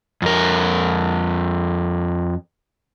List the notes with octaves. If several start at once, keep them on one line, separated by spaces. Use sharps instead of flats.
F2 A#4